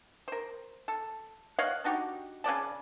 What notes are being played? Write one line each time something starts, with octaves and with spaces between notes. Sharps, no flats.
A#4 C5
A4
C#5 D#5 F5 F#5
D4 D#4 F#4 G4
C#3 F#3 D5 A5